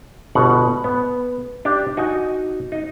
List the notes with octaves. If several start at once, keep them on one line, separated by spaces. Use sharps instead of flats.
G1 B2 F#5
B3
D4 G4
D#4 F#4 G#5
D#4